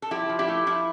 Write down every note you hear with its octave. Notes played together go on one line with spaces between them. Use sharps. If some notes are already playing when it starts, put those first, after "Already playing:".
A4
F3 E4 G4
F3
E4 G4
A3
F3 E4